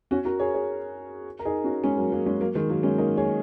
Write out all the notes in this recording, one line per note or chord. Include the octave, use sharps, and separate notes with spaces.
C#4 F#4
F#4 A#4
G#4 C#5
G#4 C#5
A#4
D#4 G#4
C#4 F#4
G#3 C#4
F#3 A#3
F#3 A#3
G#3 C#4
F#3 A#3
D#3 G#3
F#3 A#3
G#3 C#4
A#3 D#4
G#4 C#5